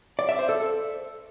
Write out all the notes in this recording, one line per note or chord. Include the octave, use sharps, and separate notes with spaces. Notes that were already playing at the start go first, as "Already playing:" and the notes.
D5
E5
C5
A4